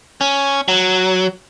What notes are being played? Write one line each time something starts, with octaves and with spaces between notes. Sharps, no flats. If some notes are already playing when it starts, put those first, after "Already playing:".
C#4
F#3